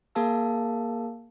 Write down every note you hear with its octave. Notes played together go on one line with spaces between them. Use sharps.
A#3 G#4 A#4 F5 A5 E6